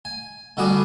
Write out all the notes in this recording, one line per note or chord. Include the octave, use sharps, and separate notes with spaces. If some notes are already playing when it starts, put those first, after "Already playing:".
G#5
D3 G3 B3 F#4 G#4 D5